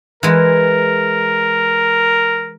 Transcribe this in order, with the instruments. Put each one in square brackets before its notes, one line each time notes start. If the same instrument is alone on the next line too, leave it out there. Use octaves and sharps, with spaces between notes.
[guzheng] E3 G#3 [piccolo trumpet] A#4